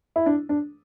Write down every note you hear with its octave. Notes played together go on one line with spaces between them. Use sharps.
E4
D4
D4